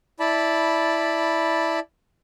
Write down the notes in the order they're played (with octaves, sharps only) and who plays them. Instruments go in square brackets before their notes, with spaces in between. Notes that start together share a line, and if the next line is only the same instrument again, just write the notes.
[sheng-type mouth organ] E4 D5 A5 B5